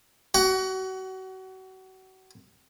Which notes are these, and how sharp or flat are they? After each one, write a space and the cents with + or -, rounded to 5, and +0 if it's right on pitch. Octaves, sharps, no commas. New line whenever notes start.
F#4 +30 F#5 +20